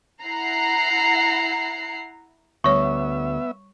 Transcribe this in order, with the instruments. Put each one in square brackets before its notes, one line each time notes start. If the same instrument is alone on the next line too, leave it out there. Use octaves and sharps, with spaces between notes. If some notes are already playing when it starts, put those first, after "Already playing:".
[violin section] E4 F#5 A#5 C7
[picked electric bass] D2 [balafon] G3 C#5 [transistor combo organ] B3 E5 [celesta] C#6